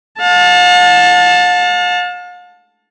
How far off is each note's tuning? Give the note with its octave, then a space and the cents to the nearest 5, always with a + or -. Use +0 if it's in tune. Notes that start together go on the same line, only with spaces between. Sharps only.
F5 +45 A5 +0